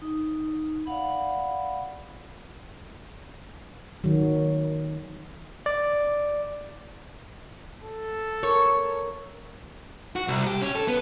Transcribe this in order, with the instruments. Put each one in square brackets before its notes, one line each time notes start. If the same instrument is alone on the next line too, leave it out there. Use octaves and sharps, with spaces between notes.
[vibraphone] D#4
D5 F5 F#5 B5
[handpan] D#3 F#3
[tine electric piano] D5
[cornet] A4
[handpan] A#4 [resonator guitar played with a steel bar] C#5
[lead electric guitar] F#4
C2
G4
C#4
A4
B3